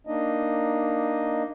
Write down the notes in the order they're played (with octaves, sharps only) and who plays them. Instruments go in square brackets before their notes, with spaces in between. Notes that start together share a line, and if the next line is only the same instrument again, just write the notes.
[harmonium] A#3 D4 D#4 D#5